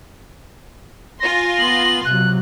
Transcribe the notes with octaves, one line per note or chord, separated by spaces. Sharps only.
F4 G#5 C6 A#6
B3 F#7
C3 F#3 F#6